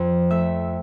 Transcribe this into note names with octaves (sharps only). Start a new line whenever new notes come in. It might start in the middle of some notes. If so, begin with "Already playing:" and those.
Already playing: F2 F3 C5
A3 E5